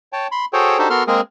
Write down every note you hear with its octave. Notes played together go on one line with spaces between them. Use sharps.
C#5 G5 A5
B5 C6
F#4 G#4 A4 C5 C#5 G5
D4 D#4 F#4 G4 A4 C5
B3 F#4 A4 A#4 C6 F6
G#3 A#3 C4 G#4 A#4